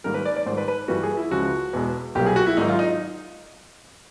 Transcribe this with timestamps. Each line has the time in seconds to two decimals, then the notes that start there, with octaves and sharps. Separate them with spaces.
0.04 G#2 D#3 G3 A#3 A#4
0.14 B4
0.25 D5
0.36 D5
0.46 G#2 D#3 G3 C5
0.57 B4
0.68 B4
0.88 G2 E3 G3 A#3 F#4
1.03 G#4
1.17 E4
1.31 C#2 C#3 F3 G#3 F#4
1.73 E2 B2 G#3
2.15 C2 B2 F#3 A#3 G4
2.26 G#4
2.36 F#4
2.47 E4
2.57 G#2 D#3 F#3 D#4
2.68 F4
2.79 D#4